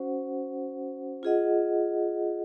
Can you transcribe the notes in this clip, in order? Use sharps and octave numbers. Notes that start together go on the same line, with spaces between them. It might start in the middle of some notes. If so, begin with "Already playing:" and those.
Already playing: C#4 F#4 C5 F#5
F4 G#4 D#5 F#5